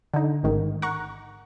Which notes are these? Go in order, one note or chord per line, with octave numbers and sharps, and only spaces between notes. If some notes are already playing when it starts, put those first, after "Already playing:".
D3 D#4
A1 G#2 D#3
F#5 A#5 C#6